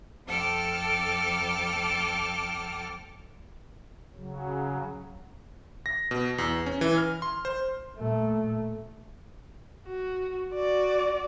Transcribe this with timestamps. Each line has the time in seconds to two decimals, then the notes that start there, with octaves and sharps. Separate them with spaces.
0.27 F2 A4 G5 A5 D6 F6
4.16 C#3 F#3
5.86 A#6
6.11 B2
6.38 E2
6.66 C#4
6.81 E3
6.98 F6
7.22 C6
7.45 C5
7.96 A#2 A3
9.86 F#4
10.53 F#4 D5